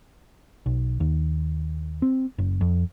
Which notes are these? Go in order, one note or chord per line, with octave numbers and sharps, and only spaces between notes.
B1
D#2
C4
F#1
F2